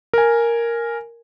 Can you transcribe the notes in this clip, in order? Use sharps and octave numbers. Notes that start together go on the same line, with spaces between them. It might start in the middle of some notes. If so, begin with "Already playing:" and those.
A#4 G#5